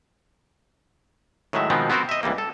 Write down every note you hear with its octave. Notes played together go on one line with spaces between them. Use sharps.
A2 D#3 F#3 G#3 E5
B2 D#3 F3 G#3 B3 C4
B3 C4 F#4 A#4 C5
D#5 E5
C#2 E3 G3 A#3
A4